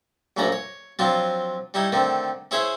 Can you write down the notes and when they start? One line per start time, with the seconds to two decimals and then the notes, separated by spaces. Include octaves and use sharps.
0.37 A#1 F#2 A3 C#4 D5 A#5
0.52 C#5
0.99 F3 F#3 C4 D4 F4
1.74 G3 D#4 E4 C#5
1.92 D3 D#3 A3 C4
2.51 C#4 E4 G#4 C5 C#5 E5